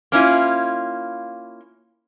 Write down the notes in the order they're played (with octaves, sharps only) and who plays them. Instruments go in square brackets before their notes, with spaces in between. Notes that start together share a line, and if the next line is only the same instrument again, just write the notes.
[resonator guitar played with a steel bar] A#3 C#4 E4 F4